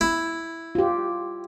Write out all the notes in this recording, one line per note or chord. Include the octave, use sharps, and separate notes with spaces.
E4
F4 G4